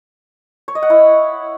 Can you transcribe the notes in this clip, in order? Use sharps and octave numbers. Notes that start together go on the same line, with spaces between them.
C#5
D#5
F#5
E4